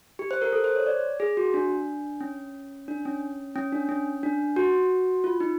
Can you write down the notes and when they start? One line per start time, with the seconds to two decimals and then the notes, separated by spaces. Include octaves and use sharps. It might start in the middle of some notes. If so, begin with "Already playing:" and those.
0.19 G4
0.31 C5
0.42 A#4
0.52 A4
0.64 C5
0.76 C#5
0.86 D5
1.20 G#4
1.37 F#4
1.54 D4
2.21 C#4
2.88 D4
3.05 C#4
3.56 C#4
3.72 D4
3.89 C#4
4.23 D4
4.56 F#4
5.24 F4
5.40 D#4